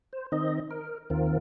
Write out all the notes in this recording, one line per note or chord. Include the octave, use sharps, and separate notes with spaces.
C5
D#3 C4 D#4 D#5
A#4
D#2 D#3 C4 F4 A#4